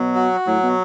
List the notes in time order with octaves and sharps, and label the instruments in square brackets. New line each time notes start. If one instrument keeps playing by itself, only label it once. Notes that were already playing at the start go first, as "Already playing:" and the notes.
Already playing: [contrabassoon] B2 [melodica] F#3
[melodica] F#4
[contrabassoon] A2 [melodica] F#3
[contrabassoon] B2